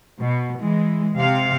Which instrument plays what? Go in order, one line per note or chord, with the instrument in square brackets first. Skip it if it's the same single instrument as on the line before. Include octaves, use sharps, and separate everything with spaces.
[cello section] B2
E3 G#3
C3 F5